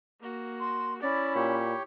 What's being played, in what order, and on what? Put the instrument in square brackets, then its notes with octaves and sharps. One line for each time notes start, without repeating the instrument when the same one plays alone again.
[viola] A#3 F#4
[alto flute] C6
[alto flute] C#4 [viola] E4 B5 [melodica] D5
[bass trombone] A#2 [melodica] G4 C#5